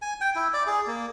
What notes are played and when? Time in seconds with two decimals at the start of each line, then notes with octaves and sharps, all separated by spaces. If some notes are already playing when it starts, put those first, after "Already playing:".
0.02 G#5
0.21 G5
0.35 E4
0.53 D5
0.67 G#4
0.87 A#3